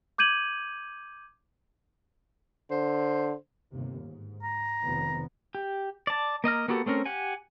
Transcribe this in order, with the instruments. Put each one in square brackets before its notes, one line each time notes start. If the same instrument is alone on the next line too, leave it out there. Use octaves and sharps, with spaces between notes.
[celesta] D6 G6 G#6 D#7 F#7
[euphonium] D3 [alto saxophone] C5
[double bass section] G1 D#2 C3
G#2
[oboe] A#5
[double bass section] F1 D#3 B3
[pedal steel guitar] G4
D5 A5
A#3 D#5 A#5 F6
A#3 B3 F#4 G4 A4
A3 C4 C#4 A#4
G4 F#5 G#5